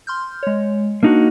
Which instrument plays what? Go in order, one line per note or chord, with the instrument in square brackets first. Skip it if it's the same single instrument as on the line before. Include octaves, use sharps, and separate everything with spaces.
[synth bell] C6 F6 G6
G#3 C#5
[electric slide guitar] A#3 D#4 F#4 [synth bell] D4